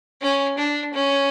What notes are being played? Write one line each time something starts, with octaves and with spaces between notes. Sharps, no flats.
C#4
D4
C#4